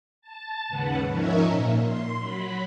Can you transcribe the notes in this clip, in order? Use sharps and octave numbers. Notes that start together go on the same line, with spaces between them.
A5
D#2 G#2 C#3 B4 F#5
F3 C#4 D#4 A#4 C#5 E5
A#2
C6
F#3 B5